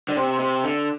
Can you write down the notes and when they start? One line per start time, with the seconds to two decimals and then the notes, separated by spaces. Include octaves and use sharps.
0.09 D3
0.16 C3
0.40 C3
0.63 D3